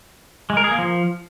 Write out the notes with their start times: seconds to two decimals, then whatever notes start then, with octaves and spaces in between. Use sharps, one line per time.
0.50 G#3
0.57 A#4
0.64 G#4
0.71 A#3
0.78 F3